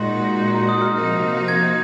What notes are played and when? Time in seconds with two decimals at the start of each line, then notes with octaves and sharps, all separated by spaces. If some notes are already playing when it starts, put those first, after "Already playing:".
Already playing: A#2 G#3 D#4 F#4 C6
0.42 C6
0.55 A#5
0.69 D#6
0.82 F6
0.95 C3 F3 A#3 D#4 F#4
1.48 G#6